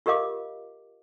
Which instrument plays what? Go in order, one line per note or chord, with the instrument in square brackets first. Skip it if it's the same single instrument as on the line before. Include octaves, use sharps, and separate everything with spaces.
[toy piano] F4 G4 A#4 D#5 F5 D6